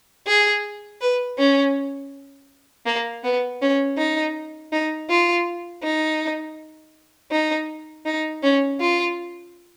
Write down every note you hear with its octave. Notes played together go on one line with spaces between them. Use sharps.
G#4
B4
C#4
A#3
B3
C#4
D#4
D#4
F4
D#4
D#4
D#4
C#4
F4